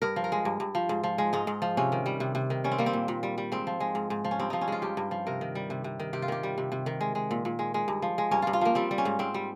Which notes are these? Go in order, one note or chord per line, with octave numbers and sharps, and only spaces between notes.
G2 A#4
F3
A#4
G#3
G2
G2
F3
G#2
F3
G#3
G#2 D#4
G#2
F3
C3 C#4
D#3
G3
C3
C3
D#3
G3 C#4
C4
G3 A#3
C4
A#2
A#2
G3
G3
G#2 C4
F3
G#3
G#2
G#2
F3
C#4
G2 C4
F3 D#4
C#4
G#3 F4
G2 G4
G2
F3
C3 A#4
D#3
G3
C3
C3
D#3
C3 G4
F4
D#3 G4
G3
C3
C3
D#3
G#3
G#3
A#2
A#2
G#3
G#3
G2
F3
G#3
G2 C#4
G2 F4
F4
F3 A#3
G3 C4
G3
C#4
G#2
G#2 C4
G3